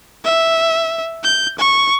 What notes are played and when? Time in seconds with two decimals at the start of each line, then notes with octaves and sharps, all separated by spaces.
0.25 E5
1.24 G6
1.58 C#6